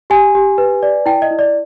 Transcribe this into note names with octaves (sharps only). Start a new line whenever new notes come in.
G4 G#5
G4
B4
D5
E4 G5
D#5
E4
D5